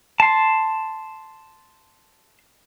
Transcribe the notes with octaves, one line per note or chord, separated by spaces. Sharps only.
A5 C6